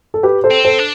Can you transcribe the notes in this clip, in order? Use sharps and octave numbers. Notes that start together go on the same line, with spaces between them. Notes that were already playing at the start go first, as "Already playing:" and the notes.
A4
G4 B4
A4 C5
C4
A4 C5
D4